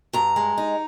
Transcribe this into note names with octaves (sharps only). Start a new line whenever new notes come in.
G2 A#5
G#3
D#4